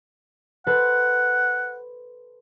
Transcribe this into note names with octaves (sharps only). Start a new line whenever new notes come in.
A4 B4 C5 F#5